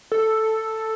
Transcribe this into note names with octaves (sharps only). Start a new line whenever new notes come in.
A4